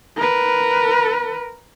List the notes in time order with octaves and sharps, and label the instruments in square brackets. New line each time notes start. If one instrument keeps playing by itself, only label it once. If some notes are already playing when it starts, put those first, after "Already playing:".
[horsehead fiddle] A#4 B4